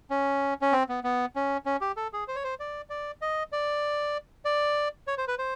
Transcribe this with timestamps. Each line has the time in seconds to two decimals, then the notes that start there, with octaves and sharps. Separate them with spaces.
0.10 C#4
0.62 C#4
0.72 C4
0.89 B3
1.04 B3
1.36 C#4
1.66 C#4
1.81 G4
1.97 A4
2.13 G#4
2.28 C5
2.36 C#5
2.44 C5
2.60 D5
2.90 D5
3.22 D#5
3.52 D5
4.45 D5
5.07 C#5
5.18 C5
5.28 B4
5.39 C5